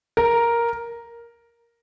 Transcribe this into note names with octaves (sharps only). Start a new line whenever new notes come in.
A#4